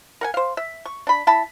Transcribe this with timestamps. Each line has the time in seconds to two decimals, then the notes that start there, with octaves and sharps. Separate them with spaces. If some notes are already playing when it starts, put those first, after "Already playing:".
0.21 A#4 F#5 G#5
0.34 C5 F5
0.57 E5
0.85 C#6
1.07 D4 B5
1.27 E4 A5 B5